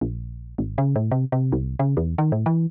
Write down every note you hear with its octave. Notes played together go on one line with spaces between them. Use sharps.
A#1
G#1
C#3
A2
C3
C3
C2
C#3
E2
D#3
A2
E3